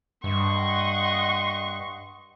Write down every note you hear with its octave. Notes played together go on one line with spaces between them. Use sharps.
G2 D#5 F#5 C6 C#6